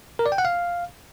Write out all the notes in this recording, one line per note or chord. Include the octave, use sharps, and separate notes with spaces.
A#4
D5
G5
F#5
F5